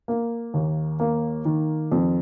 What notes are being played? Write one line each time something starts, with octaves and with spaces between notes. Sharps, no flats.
A#3
D#2
A#3
D#3
F2